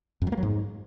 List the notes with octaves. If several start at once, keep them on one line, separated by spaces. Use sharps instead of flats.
F2
F#3
A#3
F#3
G#2